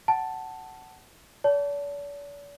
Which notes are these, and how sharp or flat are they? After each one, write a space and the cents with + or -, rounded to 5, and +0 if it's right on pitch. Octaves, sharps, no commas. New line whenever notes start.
F#5 +20 A5 +0
D5 -45 A5 +0